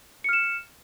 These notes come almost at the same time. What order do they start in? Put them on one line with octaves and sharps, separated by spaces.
C#7 F6 E7